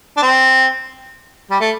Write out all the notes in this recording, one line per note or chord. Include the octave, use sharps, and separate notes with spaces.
D4
C4
G3
A3